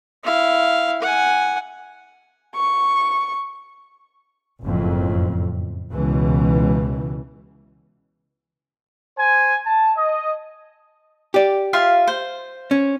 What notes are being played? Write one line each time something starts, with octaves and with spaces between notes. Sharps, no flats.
E4 F5
F#5 G#5
C#6
F#1 F2 A2
C#2 B2 E3
C5 G#5
A5
D#5
G4 D5
F4 E5 F5
C5
C#4